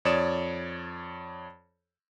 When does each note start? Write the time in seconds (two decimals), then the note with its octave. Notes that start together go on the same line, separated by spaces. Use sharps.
0.05 F2 C#5 D5 D#6 E7